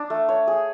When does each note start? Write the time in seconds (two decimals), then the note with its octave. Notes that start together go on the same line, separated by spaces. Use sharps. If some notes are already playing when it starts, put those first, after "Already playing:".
Already playing: D4
0.10 A3
0.29 C#5
0.47 G#4